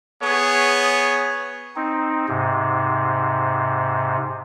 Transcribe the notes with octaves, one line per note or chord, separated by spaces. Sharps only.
B3 G#4 C#5
C4 D#4
G#2 C3